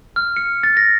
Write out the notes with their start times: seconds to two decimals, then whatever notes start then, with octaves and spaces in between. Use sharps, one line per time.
0.16 F6
0.36 C#7
0.63 A6
0.77 A#6